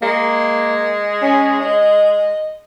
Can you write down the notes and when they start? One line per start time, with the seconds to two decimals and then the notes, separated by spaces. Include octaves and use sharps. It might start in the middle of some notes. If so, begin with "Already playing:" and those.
0.02 G#3 A#3
1.22 C#4
1.61 D#5